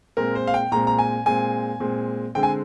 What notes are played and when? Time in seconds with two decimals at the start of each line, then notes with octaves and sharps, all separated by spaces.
0.17 A#2 G#3 C4 A#4
0.35 C5
0.47 F5
0.54 G5
0.72 A#2 G#3 C4 A#5
0.87 A#5
0.99 G#5
1.26 A#2 G#3 C4 G#5
1.80 A#2 G#3 C4
2.35 D3 G#3 C4 G5
2.43 G#5